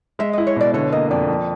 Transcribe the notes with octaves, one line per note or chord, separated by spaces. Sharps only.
G#3 E5
E4 D#5
C#5
B2 D5
D3 C#5
A#3 D#5
F2 D5
F2